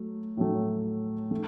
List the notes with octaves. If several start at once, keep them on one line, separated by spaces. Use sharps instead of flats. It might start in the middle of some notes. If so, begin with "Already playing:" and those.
Already playing: F#3 A3
A2 F#3 A3
A3